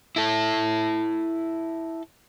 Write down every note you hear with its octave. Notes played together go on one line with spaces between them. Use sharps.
E4 A4